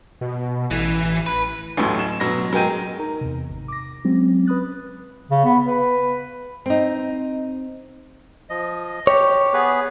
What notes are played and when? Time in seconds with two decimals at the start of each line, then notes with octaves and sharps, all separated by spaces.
0.21 B2
0.71 A1 E3
1.26 B4
1.77 A1 D2 A2 F#3 C6
1.99 E7
2.20 B2 F#3 A#6
2.53 F#3 G#3 A#4 G5 D#7
2.99 D#4 A#4 A#5
3.21 E2 C3
3.49 G#1
3.68 D6 A#6
4.05 F#3 G#3 C4 C#4
4.46 B4 B5 D#6 F#6 A6
5.31 C#3
5.45 B3
5.66 B4
6.66 C4 D#4
8.50 F3 D#5
9.07 G4 C#5
9.53 B3 G#4 B4